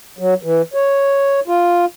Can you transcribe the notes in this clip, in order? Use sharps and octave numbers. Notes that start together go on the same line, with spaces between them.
F#3
E3
C#5
F4